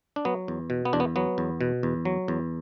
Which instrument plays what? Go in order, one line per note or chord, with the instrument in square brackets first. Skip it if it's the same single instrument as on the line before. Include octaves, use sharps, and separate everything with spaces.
[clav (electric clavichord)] D4
F#3 B3
E2
B2
B3
E2 D4
B3
F#3 B3
E2
B2
E2
F#3
E2